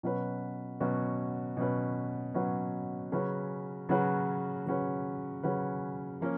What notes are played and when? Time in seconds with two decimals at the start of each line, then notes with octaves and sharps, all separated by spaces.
0.03 B2 F#3 C#4 F#4 B4
0.80 B2 F#3 C#4 F#4 B4
1.57 B2 F#3 C#4 F#4 B4
2.34 B2 F#3 C#4 F#4 B4
3.12 C#3 F#3 C#4 F#4 B4
3.89 C#3 F#3 C#4 F#4 B4
4.66 C#3 F#3 C#4 F#4 B4
5.43 C#3 F#3 C#4 F#4 B4
6.21 F3 A#3 C#4